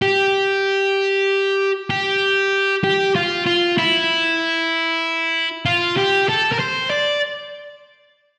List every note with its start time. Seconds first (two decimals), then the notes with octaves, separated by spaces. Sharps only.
0.02 G4
1.90 G4
2.84 G4
3.16 F4
3.46 F4
3.78 E4
5.65 F4
5.97 G4
6.29 A4
6.52 A#4
6.59 C5
6.90 D5